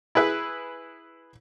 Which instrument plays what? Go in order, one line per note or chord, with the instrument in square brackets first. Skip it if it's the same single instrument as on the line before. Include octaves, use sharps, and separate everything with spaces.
[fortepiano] E4 G#4 B4 E5